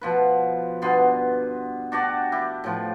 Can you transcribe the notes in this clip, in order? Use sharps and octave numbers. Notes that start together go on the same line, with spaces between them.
B2 F3 B4
G2 B2 B3 C6
D4 F#4 G4 D5
E4 G4
A2 F3